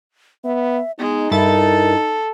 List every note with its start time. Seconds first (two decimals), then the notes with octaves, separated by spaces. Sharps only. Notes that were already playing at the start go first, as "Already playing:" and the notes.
0.44 B3 E5
0.99 G#3 B3 D#4
1.31 G2 E4 A4 A#4 A6